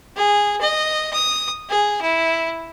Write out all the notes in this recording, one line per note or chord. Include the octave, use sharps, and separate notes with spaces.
G#4
D#5
D#6
G#4
E4